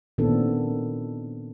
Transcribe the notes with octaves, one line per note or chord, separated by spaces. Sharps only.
A#2 D#3 B3 C4 D4 A4